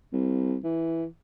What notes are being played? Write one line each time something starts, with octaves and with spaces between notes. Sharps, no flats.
C2
E3